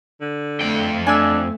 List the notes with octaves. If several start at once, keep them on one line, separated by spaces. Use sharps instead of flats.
D3
F2 A3 G5
A3 D4 G#5 E6